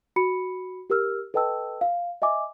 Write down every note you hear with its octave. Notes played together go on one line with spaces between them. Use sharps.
F#4 B5 C#7
G4 A#4 E6 F6
A4 B4 D#5 G5 A5 E6
F5
D#5 E5 G#5 D6